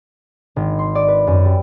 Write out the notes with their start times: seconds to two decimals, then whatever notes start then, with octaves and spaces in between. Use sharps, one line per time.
0.56 G#1
0.79 C6
0.95 D5
1.08 B4
1.27 F#2
1.45 G3